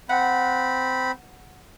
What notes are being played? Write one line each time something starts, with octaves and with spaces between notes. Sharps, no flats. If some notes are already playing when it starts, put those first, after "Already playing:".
C4 F#5 B5